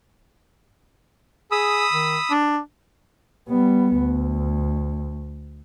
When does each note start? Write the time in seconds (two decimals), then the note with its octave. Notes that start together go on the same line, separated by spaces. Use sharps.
1.51 G#4 B5 D#6 E6
1.93 D#3
2.31 D4
3.49 G3 B3
3.97 D2